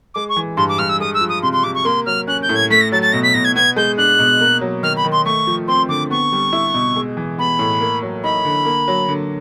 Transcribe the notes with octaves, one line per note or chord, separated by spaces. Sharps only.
G#3 D6
C#6
E3
G2 C6
D6
G2 F6
E6
G#3 D#6
E6
F3
D#6
C3 C6
C6
C3 D6
C#6
A#3 C6
F#3 F6
C#4 F#6
G6
A2
G#6
A3 B6
A#6
F#3 A6
A6
B2 A#6
B6
B2 A#6
G#6
B3 G#6
G#3 G6
D4 F#6
B2
A#3
F#3
D#3 F6
B5
D#3
C6
A3 C#6
F3
C4 C6
D3 D6
B3 C#6
G3
E4
B2
G#3
E3
B3 B5
A2
A#3
F#3
D#4 B5
D3
A#3
F#3
D3